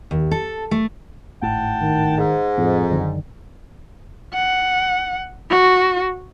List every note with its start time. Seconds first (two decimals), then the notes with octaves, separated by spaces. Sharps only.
0.11 D#2
0.31 A4
0.71 A3
1.42 G#1 A2 F#5 G5 A5
1.82 D#3
2.17 G#2
2.58 F2 A2
2.90 F#2 D3 D#3
4.34 F#5
5.50 F#4